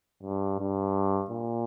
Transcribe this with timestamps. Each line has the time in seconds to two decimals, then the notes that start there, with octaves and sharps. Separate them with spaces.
0.23 G2
0.60 G2
1.30 A#2